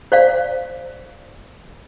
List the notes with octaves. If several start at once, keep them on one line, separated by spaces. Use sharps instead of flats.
C5 D5 F5